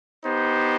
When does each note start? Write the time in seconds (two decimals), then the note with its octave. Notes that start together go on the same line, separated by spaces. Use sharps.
0.24 B3 D#4 G4 C5